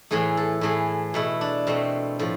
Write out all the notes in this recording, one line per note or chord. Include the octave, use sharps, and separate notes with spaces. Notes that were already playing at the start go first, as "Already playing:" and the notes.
A2 E3 A3 G#4
A4
A2 E3 A3 G#4
B2 A3 E4
D4
B2 A3 C4
A2 F3